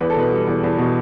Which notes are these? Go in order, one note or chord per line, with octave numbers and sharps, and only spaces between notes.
E2 B4
A4
B2 B4
G3
E2
E2
B2